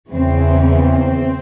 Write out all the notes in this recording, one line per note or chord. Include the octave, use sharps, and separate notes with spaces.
E2 C#3 E3 C4
C4